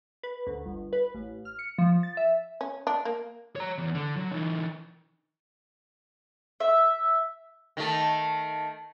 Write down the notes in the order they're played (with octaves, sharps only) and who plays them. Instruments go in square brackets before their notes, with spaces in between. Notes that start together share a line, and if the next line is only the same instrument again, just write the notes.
[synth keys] B4
D2
G1
B4
A1
F6
C#7
F3
A6
E5
[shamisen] C#4
D4
A#3
[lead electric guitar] C#5 A#5
E2
D3
F#3
E3 D#4
[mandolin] E5
[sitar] D#3 A3